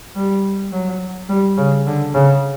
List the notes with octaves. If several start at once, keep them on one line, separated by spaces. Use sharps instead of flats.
G3
F#3
G3
C#3
D3
C#3